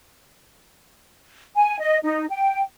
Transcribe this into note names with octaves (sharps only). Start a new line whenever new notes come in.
G#5
D#5
D#4
G5